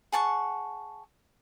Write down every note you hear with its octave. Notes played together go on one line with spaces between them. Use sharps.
G#4 F#5 A5 C#6